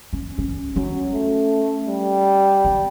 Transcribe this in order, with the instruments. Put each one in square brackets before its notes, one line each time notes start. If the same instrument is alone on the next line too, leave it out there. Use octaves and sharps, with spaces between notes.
[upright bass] C#4
C#4
[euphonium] F#3 [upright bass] C#4
[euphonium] A3
G3
[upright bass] B3